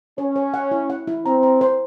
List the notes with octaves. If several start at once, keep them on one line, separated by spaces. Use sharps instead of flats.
C#4 C#5
C#5
F#5
E4
F#5
E4
C4 A#5
A#5
C5